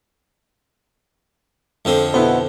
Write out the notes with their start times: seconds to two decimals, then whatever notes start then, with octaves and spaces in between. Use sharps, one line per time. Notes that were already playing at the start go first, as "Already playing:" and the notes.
1.85 F2 D3 C4
2.14 B2 B3 E4 C5 F#5